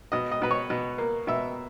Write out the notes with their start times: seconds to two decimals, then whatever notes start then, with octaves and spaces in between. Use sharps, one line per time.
0.12 B2 D#5
0.31 D#5
0.42 B2 B4
0.51 C#5
0.70 B2
0.98 A#3
1.27 B2 E5